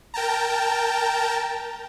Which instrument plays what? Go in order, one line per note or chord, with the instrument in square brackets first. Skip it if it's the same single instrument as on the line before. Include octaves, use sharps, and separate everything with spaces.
[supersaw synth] A#4 G5 A5 A#5